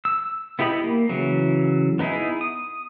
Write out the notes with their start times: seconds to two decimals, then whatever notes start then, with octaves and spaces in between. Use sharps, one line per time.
0.05 E6
0.59 B3 E4 G4 D#5 B5
0.84 A#3
1.09 C#3 E3 F#3
1.99 B3 D#4 E4 G#4
2.41 D#6